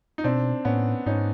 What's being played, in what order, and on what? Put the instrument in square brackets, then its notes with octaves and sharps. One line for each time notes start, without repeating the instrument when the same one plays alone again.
[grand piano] D#4
[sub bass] B2 [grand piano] C4 D4
[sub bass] A2 [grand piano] B3 C#4
[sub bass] G#2 [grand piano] C#4 D#4